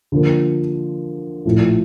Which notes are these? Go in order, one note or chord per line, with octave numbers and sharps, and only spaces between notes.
D3 F3 A#3
A#1 A2 F3 A3